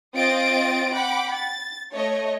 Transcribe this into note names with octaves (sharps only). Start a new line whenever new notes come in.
C4 F4 D#5 D#6 A6 D7
F#5 G5 B5 D6
A6
A3 C#5 D#5